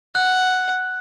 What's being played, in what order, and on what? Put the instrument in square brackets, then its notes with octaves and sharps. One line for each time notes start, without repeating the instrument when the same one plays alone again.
[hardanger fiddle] F#5 [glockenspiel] F#6